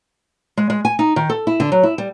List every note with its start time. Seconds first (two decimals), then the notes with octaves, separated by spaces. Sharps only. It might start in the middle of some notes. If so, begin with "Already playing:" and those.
0.57 G#3
0.70 G#3
0.85 G#5
0.99 D#4
1.16 D#3
1.30 A4
1.47 E4
1.60 D3
1.72 F#3
1.83 E4
1.98 G3